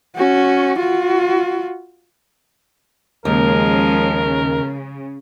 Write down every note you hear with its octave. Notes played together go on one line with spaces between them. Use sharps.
C#4 F#4
F4 F#4
D#2 C#3 F3 G#3 A#4